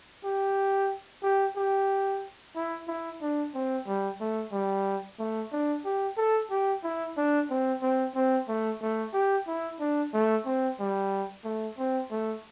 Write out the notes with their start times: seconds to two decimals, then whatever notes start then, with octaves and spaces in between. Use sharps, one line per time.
0.24 G4
1.23 G4
1.56 G4
2.56 E4
2.88 E4
3.22 D4
3.54 C4
3.87 G3
4.21 A3
4.52 G3
5.19 A3
5.52 D4
5.85 G4
6.17 A4
6.51 G4
6.83 E4
7.17 D4
7.50 C4
7.82 C4
8.15 C4
8.48 A3
8.82 A3
9.14 G4
9.47 E4
9.80 D4
10.13 A3
10.46 C4
10.80 G3
11.44 A3
11.78 C4
12.11 A3